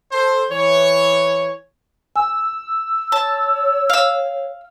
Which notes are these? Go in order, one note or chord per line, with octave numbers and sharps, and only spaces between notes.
A4 C5
E3 C#5
G#5 E6
C#5 A5
F5 E6